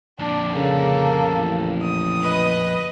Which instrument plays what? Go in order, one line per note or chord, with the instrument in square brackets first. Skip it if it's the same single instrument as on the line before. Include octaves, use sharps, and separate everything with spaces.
[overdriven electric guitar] F2 A#2 [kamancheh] D4
[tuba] C#3 [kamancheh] A#3 A4
[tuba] A1
[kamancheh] D#6
[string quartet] B4 D#5